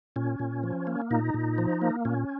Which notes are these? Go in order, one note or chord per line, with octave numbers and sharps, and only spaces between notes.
A#2 C#4
A#2
F3
A#3
A#2 D#4
A#2
F3
A#3
A#2 C#4